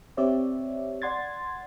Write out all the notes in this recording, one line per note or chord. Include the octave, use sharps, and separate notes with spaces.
C4 G4 C#5 D5 E5
D5 F#5 C6 G#6 A6